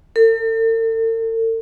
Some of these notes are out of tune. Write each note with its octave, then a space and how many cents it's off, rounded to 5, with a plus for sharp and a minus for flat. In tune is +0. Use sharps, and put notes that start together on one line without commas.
A4 +45